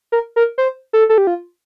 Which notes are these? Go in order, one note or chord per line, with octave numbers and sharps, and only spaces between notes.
A#4
A#4
C5
A4
A4
G4
F4